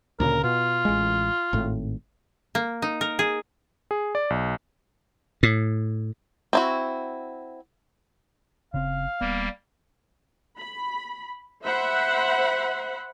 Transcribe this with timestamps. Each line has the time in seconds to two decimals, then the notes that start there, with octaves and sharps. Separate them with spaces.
0.20 D2 A#2 C#3 A#4
0.43 B2 F4
0.85 A1 G#3
1.53 G#1 A2
2.55 A#3
2.82 D#4
3.01 A#4
3.19 G#4
3.91 G#4
4.15 D5
4.30 B1
5.43 A2
6.53 C4 E4 F#4
8.74 F#1 C#3 C4 F5
9.21 D#1 G3 A#3 B3
10.57 B5
11.63 C5 E5 F#5 B5